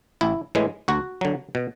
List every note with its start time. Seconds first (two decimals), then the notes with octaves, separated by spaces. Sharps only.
0.21 A1 E4
0.55 A2 E3 G#3
0.88 D2 F#4
1.21 D3 F#3
1.55 B2